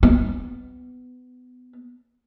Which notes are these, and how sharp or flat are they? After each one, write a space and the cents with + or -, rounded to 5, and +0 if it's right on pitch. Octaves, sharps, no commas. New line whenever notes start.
B3 +20